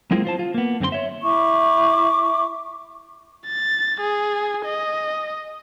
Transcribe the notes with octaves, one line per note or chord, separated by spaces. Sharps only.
F#3 G#3 A#3 C4 E4 F4
F4 C5 A5
F4
A#3 B3
F#2 D3 C4 F#4 C6
C#5 E5
E4 E5 C#6 D6
A6
G#4
D#5